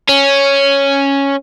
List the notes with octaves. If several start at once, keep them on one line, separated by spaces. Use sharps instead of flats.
C#4